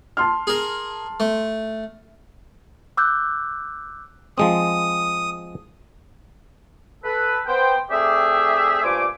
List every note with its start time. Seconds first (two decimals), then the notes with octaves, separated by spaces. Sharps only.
0.17 A5 C6 F6
0.47 G#4 A#4
1.20 A3
2.97 D6 E6 F#6 G6
4.38 F3 G#3 C4 D#6
7.04 A4 B4
7.46 B3 C5 G5
7.90 A3 C4 G4 G#4 D5 E5
8.83 G2 A#2 A3 C5 G#5 D6